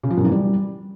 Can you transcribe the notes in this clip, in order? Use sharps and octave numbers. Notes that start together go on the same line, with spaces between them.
C#3
F3
F#2
E3
G3